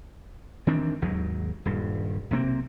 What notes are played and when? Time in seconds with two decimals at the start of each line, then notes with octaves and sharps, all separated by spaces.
0.67 D#3 E3 C4 D4
1.02 G#1 D#2 F#3
1.65 D#1 G2
2.31 B1 C3 A#3 C4